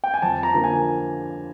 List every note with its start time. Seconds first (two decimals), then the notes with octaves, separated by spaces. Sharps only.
0.04 G5
0.14 G#5
0.22 F2 A5
0.43 A#5
0.54 D3 F3 A#3
0.64 G#5